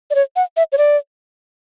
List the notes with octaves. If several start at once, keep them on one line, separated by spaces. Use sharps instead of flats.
D5
C#5
F#5
E5
C#5
D5